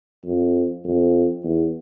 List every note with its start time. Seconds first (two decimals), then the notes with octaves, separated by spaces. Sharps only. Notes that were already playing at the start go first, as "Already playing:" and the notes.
0.25 F2
0.84 F2
1.44 E2